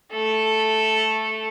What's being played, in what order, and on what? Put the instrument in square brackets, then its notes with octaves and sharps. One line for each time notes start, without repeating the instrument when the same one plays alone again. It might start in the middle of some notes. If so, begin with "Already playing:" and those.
[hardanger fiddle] A3 A4